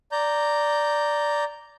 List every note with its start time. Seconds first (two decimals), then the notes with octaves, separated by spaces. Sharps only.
0.12 D5 A#5 G6